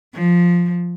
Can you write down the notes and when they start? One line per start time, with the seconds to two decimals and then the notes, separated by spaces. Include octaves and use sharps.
0.15 F3